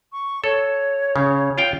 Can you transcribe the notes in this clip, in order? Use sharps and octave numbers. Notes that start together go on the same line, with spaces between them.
C#6
A4 C#5
C#3
F4 F5 G5